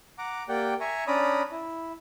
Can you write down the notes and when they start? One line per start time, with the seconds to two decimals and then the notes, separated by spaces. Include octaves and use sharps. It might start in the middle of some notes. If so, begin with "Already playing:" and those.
0.18 F#5 A#5 D6
0.49 A#3 G4 D5 F#5 G5
0.80 E5 G#5 A#5 C#6
1.07 C#4 D4 D5 A#5 B5 D#6
1.51 E4